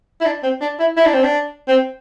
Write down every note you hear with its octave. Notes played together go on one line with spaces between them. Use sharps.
E4
D4
C4
D4
E4
E4
D4
C4
D4
C4